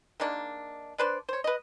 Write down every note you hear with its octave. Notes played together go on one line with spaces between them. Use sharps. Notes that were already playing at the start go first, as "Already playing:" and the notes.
D#3 G#3 A#3 D4
D4 B4 C5 D5
C5 C#5
B4 D#5